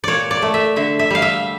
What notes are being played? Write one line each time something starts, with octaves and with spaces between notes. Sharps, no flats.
A#2 C#5 D5
D5
A3
E5
D3 E5
E5
G3 F5
E5